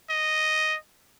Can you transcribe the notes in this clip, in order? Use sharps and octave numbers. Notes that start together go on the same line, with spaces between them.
D#5